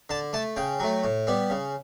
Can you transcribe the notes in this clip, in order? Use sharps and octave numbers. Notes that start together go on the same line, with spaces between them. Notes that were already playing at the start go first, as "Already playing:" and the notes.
D3 A5
A3 A5
C#3 G5
F#3 A3
A2
G3 B3
C#3